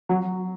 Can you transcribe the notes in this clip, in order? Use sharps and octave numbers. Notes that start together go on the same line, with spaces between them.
F#3